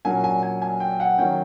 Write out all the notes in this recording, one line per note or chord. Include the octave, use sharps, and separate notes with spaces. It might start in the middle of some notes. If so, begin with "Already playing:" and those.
A#2 F#3 A#3 C#4 G#5
G#5
G#5
G#5
G5
F#5
D#3 F#3 A#3 C#4 G5